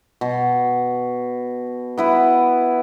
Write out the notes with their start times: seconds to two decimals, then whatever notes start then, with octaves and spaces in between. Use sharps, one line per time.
0.21 B2
1.98 B3 E4 B4